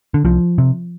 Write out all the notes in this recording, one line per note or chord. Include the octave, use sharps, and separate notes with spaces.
D3
C2 F3
C3